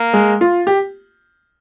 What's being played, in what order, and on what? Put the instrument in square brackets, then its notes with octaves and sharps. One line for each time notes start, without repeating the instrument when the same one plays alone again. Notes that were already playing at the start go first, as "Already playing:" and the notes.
Already playing: [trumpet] A#3
[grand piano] G#3
F4
G4